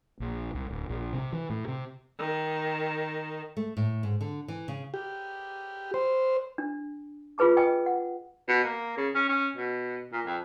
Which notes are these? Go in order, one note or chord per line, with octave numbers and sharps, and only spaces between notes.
A#1
C2
D1
A#1
C3
E3
A2
C3
D#3
A3
A2
G#2
D3
E3
C#3
G4
C5
D4
F4 G#4 B4 A5 D6
B4 D#5 G5 G#5 D#6
F#5
B2
A#3
C#3
C#4
C#4
B2
A#2
F2